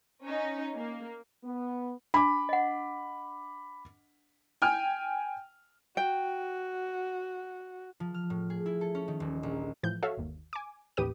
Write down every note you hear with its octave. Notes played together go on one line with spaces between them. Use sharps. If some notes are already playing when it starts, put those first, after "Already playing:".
C#4 D#4
A#3
B3
D4 B5 D6
D#5 F#5
G5 G#5 F6
F#4 G5
F3
F6
A2
G#4
E4
A4
C#4
D#3
D#1
A#1
A2 E3 F3 G6
F#4 A4 C#5 E5 F5
G1 D#2
G#5 D6
A1 D#2 G4 B4 D#6 D#7